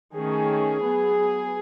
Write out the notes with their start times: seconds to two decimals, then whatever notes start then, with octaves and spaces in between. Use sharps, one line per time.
0.15 D#3 A3 C#4 G#4
0.83 F#3 B3